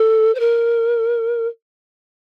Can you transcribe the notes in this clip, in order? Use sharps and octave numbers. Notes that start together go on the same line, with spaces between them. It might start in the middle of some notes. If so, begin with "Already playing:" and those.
Already playing: A4
C5
A#4